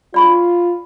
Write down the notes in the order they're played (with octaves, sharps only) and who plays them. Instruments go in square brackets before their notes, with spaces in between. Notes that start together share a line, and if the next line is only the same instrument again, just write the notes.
[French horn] F4 [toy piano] D5 B5 C#6